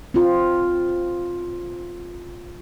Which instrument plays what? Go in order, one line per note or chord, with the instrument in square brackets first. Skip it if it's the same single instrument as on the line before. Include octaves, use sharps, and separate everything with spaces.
[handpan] C4 F4